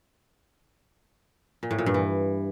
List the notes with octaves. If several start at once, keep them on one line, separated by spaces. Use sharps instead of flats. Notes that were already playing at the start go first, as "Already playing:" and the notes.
A#2
A2
A#2
G2
E3